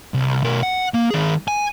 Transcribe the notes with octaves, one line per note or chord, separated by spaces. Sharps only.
C2
B2 A#4
F#5
A#3
D#3 G#4
G#5